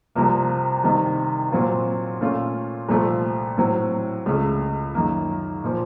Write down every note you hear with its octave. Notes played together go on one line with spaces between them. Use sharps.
C2 C3 F3 A#3
C2 C3 D#3
A#2 F#3 C4 F4
A#2 A3 C#4 F4
C2 A#2 F3 A3
A2 F#3 C4
C#2 C#3 A3
F#2 D#3 A#3
A#2 F3